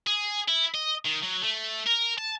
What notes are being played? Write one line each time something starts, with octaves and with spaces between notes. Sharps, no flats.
G#4
E4
D#5
D#3
F#3
A3
A#4
A5